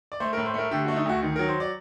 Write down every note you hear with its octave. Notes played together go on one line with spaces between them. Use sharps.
D5
A3 C5
A#4
A2
C5
A3 A#4
D3 G4
A3 F#4
D#4
D2 F#4
D#3
F#3 A#4
C5
D5